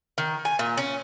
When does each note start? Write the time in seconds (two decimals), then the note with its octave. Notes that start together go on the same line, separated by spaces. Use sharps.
0.18 D#3
0.45 G#5
0.59 A#2
0.77 C#4